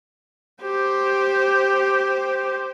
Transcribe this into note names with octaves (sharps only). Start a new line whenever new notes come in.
G4 C5